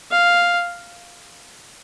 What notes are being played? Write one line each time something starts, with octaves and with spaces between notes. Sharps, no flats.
F5